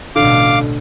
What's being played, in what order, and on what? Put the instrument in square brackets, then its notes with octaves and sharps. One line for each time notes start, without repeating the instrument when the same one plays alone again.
[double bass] A1 B2 [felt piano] D3 [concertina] F5 D6